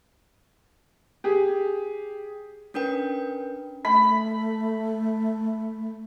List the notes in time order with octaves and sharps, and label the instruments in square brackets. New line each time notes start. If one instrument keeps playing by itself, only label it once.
[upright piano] G4 G#4
[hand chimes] C#4 D4 A#4 B4 G5
[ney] A3 [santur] B5